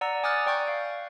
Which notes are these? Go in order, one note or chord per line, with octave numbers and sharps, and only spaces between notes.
D5 F#5 A#5 E6
G#5 D6 D#6 F6 F#6 A6
D5 G5 C#6 G6
F5